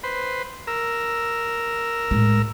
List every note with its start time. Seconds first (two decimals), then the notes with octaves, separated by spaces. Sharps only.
0.03 B4 C5
0.67 A#4 E6
2.11 A2 G#3